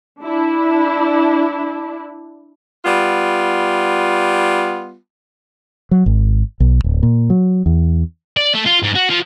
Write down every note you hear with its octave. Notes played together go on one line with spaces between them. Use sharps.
D4 E4
G3 B3 F4
F#3
G#1
B1
D1
A#2
F#3
E2
D5
A3
F4
G#2
F#4
F3